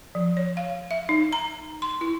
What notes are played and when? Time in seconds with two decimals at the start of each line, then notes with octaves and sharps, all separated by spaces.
0.15 F3
0.37 C#5
0.57 F5
0.91 E5
1.09 D#4
1.33 A#5
1.82 C6
2.01 E4